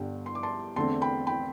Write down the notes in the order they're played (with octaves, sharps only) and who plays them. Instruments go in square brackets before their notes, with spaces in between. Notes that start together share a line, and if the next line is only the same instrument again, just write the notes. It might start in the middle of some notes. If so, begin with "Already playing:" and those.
Already playing: [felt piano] G1 G2 D3 G5
C6
D6
A5 C6
E2 D3 A3 C4 A5 C6
G5 B5
G5 B5